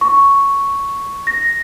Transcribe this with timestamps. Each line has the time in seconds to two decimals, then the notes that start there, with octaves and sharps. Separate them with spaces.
0.01 C#6
1.27 A#6